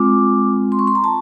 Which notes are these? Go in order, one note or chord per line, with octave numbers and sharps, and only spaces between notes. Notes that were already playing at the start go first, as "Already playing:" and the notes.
Already playing: G#3 C4 F4 D6
C6
C#6
C6
A#5
A5